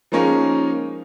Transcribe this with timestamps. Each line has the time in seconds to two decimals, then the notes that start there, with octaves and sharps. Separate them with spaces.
0.12 F3 G#3 A#3 C#4 D#4